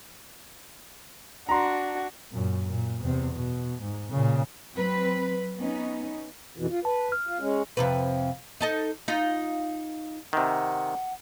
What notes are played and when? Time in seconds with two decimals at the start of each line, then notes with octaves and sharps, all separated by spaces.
1.49 D4 F#4 A#5 C6
2.32 F#2 A#2
2.67 A#2
3.02 E2 C3
3.35 B2
3.82 G#2
4.11 A#2 C#3
4.75 F#3 C4 B4
5.58 B3 C#4 D#4
6.57 F2 B2 E3
6.70 F4
6.85 B4 A5
7.12 F6
7.27 F4
7.40 G#3 C#4
7.77 F2 C3 B4
8.61 D#4 A4 D#5
9.08 D#4 F4
10.33 C3 D#3 F#5